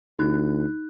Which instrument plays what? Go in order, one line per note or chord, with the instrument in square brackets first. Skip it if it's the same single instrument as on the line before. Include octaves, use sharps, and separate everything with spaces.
[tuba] D2 [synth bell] D#4 F#6